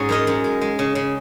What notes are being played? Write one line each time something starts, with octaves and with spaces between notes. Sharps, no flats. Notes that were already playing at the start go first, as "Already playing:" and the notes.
Already playing: G#2 C#4 F#4 G#4 C#5
F#2 A#4 D#5
F#2
G#3
G#3
C#3
C#3